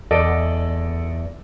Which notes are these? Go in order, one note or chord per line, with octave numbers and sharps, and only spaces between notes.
E2 A4 D5 D#5 D7